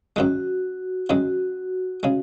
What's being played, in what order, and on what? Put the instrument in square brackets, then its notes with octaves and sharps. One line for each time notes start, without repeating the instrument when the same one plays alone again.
[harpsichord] F#2 D#3 G#3 [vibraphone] F#4
[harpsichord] F#2 D#3 G#3 [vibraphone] F#4
[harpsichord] C#3 G#3